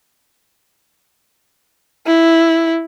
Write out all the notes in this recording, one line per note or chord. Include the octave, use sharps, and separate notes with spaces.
E4